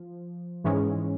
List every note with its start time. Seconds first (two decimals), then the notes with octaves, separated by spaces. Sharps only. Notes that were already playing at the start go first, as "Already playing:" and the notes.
Already playing: F3
0.64 G#2 E3 G#3 C#4